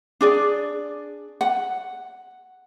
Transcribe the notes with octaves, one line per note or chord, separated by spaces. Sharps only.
D4 G#4 D5
F#5